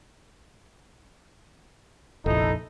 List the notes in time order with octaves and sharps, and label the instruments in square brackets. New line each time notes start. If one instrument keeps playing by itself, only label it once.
[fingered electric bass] F1 A#1 [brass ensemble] D#4 E4 A4